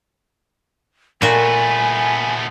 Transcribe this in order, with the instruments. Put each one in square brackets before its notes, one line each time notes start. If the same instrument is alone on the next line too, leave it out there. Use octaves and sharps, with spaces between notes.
[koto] A#2 F#4 [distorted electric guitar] A3 B3 [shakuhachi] G#5